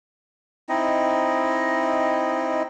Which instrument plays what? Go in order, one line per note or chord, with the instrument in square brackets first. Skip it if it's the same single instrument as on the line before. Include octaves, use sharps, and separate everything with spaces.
[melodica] C4 D#4 E4 D#5